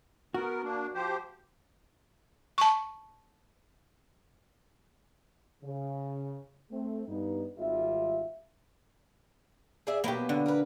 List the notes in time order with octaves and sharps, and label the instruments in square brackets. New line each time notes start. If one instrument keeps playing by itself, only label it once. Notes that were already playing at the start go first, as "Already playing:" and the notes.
[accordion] B3 A#4 [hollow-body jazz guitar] F#4
[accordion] A#3 D4
F3 G4 C5
[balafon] A5 C#6
[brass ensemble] C#3
A3 C4
G2 B3 D#4
G#1 G3 F4 E5
[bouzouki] G#4 D5 E5
[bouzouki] B2 F#3 B3 [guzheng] A#3 G4
[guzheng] D3
[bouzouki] A#4 B4